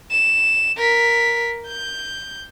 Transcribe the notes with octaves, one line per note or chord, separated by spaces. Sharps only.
E7
A#4 B6
G6